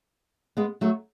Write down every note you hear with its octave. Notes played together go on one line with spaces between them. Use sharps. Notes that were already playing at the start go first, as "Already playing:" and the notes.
G#3 B3
F#3 A3